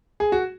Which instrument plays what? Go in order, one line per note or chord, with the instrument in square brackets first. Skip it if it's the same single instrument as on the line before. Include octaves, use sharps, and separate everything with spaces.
[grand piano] G#4
F#4